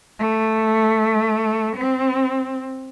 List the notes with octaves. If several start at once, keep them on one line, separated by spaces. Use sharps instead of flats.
A3
C4